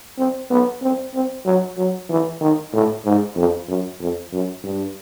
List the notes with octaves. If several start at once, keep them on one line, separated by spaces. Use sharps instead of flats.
C4
B3
C4
C4
F#3
F#3
E3
D#3
A2
G#2
F2
F#2
F2
F#2
G2